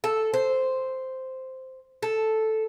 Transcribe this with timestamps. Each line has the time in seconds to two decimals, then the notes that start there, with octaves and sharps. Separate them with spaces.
0.04 A4
0.33 C5
2.03 A4